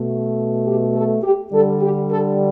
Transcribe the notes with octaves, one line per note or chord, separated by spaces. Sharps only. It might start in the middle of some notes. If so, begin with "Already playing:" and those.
Already playing: B2 A3
G4
A4
G4
D3 G3 A4
G4
A4